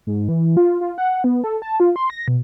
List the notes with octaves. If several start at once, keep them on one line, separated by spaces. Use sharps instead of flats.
G#2
E3
F4
F4
F#5
B3
A4
A5
F4
C6
A#6
B2